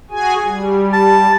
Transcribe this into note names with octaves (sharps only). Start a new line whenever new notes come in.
F#4 G#4 G#5
G3
A5